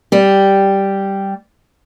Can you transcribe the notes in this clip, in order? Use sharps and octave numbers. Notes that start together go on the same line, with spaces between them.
G3 G4